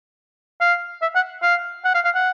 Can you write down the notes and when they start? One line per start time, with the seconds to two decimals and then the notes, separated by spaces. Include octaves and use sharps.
0.61 F5
1.02 E5
1.15 F#5
1.43 F5
1.85 F#5
1.94 F5
2.05 F5
2.15 F#5